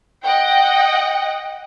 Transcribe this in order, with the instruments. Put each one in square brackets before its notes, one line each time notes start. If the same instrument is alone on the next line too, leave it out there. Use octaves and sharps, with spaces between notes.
[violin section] D#5 F#5 G5